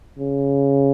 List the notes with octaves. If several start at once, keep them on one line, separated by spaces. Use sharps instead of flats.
C#3